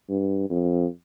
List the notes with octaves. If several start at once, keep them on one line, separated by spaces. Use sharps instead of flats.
G2
F2